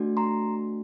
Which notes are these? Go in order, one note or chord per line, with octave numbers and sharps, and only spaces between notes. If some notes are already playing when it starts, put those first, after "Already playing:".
Already playing: A3 D4 F#4
A#5 C6